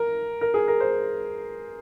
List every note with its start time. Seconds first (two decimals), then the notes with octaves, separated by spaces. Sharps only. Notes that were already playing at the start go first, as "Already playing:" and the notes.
Already playing: A#4
0.41 A#4
0.54 G#4
0.68 A#4
0.80 C5